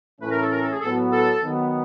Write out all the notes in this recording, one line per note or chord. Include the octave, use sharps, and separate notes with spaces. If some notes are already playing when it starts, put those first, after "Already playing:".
A2 E3 A3 C#4 B4
A#4
A4
A#4
A4
G#4
A2 F#3 B3 A4
A4
D#3 F#3 B3